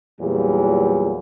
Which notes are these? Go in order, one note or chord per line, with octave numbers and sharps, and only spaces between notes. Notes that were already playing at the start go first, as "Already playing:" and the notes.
E2 A#2 F#3 G3